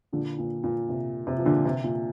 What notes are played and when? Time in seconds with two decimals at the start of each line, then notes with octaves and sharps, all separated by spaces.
0.13 A#2 D3
0.38 A#2
0.64 A#2
0.89 C3
1.27 C3
1.38 F3
1.45 A#2 D3
1.65 C3
1.84 A#2